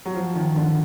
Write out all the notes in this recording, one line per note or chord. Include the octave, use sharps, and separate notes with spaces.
F#3
F3
D#3
D3